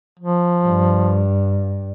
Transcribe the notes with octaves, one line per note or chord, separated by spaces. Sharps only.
F3
G2